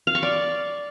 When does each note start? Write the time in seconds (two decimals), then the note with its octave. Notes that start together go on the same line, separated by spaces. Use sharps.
0.07 F5
0.15 C#6
0.23 D5